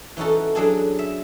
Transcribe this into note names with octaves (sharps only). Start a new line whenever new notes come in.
E3 C#4 D#4 F#4 A4
F#3 D4 G#4 A4
E5